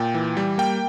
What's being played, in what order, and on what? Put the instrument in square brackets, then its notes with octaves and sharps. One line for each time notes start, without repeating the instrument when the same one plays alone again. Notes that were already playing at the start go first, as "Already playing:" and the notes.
Already playing: [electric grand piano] A#2 G5
E3
G3
A#3 G5